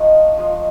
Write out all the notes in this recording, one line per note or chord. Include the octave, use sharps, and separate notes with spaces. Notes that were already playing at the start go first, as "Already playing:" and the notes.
Already playing: F3 G#3 D#4 C#6
F3 G#3 D#4